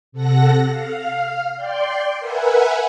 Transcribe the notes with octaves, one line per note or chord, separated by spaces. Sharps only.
C3 A4 F#5 A#6
F5
D5 G5 C6
A#4 B4 E5 F#5 G#5